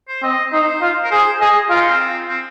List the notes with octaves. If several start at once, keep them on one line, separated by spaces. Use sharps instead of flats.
C5
C4 D#5
D#4 C5
F4
A#4
G#4 C5
G#4 D#5
F4 A#4
D#4
C4
C4